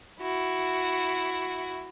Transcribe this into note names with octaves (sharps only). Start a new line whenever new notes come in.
E4 F#4